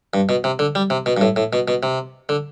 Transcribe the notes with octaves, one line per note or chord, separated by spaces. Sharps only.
G2
B2
C3
D3
G3
C3
B2
G2
A2
A2
B2
B2
C3
D3